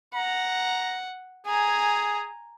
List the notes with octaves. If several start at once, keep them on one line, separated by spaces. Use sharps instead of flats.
F#5 A#5
G#4 G#5 A#5